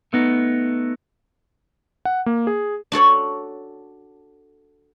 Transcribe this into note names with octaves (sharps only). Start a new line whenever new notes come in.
A3 B3 D#4
F#5
A#3
G#4
D4 F#4 A4 C#5